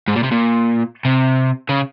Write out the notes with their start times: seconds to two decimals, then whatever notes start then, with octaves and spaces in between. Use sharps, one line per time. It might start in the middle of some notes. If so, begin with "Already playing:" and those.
0.08 G#2
0.16 A#2
0.23 C3
0.31 A#2
1.05 C3
1.69 C#3